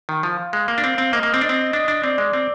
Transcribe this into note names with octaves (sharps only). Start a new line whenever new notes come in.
D#3
F3 F5
G#3
A#3
D4
C4
C4
A#3 D#5
A#3
C4
D4 D#5
C4
D4
D4
C4 D5
G#3
C4